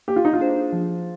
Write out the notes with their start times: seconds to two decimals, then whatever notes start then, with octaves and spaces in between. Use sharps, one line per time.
0.08 A#3 G4
0.16 F4
0.25 D#4
0.33 F4
0.40 D4 G#4 C5
0.73 F3